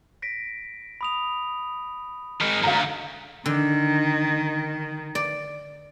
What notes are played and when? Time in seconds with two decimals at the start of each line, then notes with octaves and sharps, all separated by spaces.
0.22 A#6 B6 D7
1.01 B5 D#6 F7
2.41 D#3 G#3 F6
2.63 D2 G#2 F5 A#5
3.46 D3 D#3
5.15 D5